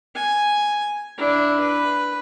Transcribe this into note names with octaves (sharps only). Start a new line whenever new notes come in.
G#5
D4 E4
B4